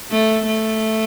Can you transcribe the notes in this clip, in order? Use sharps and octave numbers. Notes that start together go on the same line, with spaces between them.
A3
A3